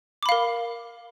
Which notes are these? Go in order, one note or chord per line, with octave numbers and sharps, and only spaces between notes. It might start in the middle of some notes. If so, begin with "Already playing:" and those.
A#4 F5 B5 D6